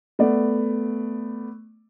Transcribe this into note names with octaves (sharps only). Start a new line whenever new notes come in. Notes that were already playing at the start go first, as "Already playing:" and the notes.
A3 B3 D5